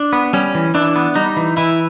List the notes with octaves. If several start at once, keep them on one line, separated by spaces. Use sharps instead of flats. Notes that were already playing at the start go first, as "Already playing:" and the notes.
Already playing: D4
B3
G3 C#4
E3
E3 D4
B3
G3 D#4
E3
E3 E4